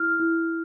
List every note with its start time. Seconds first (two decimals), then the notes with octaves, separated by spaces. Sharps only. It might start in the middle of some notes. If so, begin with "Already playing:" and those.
Already playing: E4 F6
0.20 E4